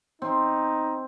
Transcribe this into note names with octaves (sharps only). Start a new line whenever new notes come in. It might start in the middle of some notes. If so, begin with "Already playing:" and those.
C4 D#4